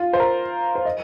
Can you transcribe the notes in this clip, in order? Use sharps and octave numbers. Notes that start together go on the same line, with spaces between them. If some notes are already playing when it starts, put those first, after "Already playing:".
Already playing: F4
C5
A#4
C5
D#5